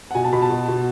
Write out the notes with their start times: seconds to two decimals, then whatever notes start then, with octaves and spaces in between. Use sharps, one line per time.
0.11 F#5
0.15 B2 G#5
0.24 A5
0.33 B2 B5
0.42 A5
0.50 B2
0.68 B2